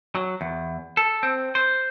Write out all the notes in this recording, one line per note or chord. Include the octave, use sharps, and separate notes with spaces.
F#3
E2
A4
C4
C5